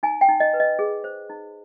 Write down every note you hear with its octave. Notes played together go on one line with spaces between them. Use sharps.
D#4 G#5
G5
D#4
D#5
B4
D#5
G#4
C5
D#4